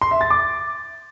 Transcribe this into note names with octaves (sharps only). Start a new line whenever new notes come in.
C6
E5
A6
D6